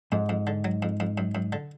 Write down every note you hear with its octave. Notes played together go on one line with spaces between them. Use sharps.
F2 G#2
F2
D3
F#3
F2
F2
F#2
F#2
D3